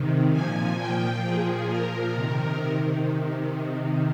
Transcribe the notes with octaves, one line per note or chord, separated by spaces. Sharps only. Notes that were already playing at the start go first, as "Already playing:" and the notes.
Already playing: C3 D#3
A#2 F3 G#5
A#2 F3 G5
A#2 F3 G#4
A#2 F3 A#4
C3 D#3 A#4
C3 D#3